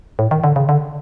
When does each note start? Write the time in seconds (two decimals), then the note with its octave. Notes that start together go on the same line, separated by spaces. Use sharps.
0.19 A2
0.31 D#3
0.44 D3
0.56 C#3
0.69 D3